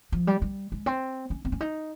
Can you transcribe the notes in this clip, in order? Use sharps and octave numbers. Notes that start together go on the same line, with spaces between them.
F3
G3
G3
G#3
C4
C#4
C4
C#4
D#4